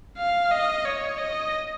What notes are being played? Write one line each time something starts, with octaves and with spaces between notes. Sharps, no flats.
F5
D#5
C#5
D#5